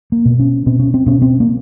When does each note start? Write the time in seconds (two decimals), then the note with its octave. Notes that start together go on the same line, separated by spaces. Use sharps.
0.12 A#3
0.25 B2
0.39 C#4
0.66 B2 C4
0.80 C#4
0.94 C4
1.06 B2 C#4
1.22 C4
1.40 A#3